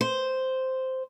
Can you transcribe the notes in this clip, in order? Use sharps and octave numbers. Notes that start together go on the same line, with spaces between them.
C5